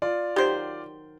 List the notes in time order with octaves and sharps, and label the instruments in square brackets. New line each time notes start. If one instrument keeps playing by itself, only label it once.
[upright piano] F4 D5
[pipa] D#3 F#3 C5 [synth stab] G4